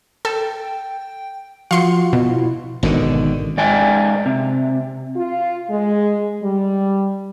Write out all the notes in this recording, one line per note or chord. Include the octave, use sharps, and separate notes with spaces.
A4 G5
F3 F4 F#4 F5 C6 C#7
B2 E4
G#1 B2 D3 D#3
G#2 D5 G5 G#5
C3
F4
G#3
G3